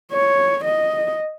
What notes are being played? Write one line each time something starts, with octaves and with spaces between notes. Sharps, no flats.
C#5
D#5